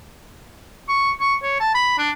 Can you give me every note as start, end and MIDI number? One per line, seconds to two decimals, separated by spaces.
0.89 1.11 85
1.20 1.35 85
1.42 1.57 73
1.60 1.71 81
1.74 1.94 83
1.98 2.10 62